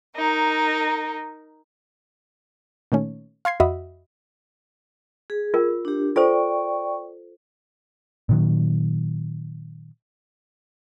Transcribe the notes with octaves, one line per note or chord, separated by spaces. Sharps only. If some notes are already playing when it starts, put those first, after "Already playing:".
D#4 A#4
A#2 D#3 A3 C#4
F5 C6 G#6 C7
F2 F#4 D#5 E5 B5
G#4
F4 A#4
D4 G4
F4 A4 C5 D5 G5 C#6
A#2 D#3 F#3